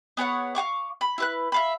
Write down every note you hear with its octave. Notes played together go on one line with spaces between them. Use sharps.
B3 G#4 C#5 F#5
F5 F#5 C#6 D6
B5
E4 B4 F#6
E5 F5 B5